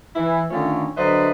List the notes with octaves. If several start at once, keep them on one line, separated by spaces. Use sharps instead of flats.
E3 E4
D3 D#3 A3 C#4 F4
D3 F#3 B4 C5 D#5 E5